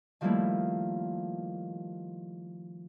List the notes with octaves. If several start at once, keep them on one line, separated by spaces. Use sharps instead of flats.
D#3 F3 G3 A3 A#3 E4